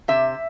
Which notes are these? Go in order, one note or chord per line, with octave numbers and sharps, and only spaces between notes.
C3 E5